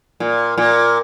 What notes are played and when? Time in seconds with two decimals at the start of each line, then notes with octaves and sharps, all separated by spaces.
0.20 A#2
0.58 A#2